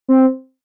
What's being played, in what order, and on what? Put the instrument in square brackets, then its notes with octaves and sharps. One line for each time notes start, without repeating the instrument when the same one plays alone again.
[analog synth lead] C4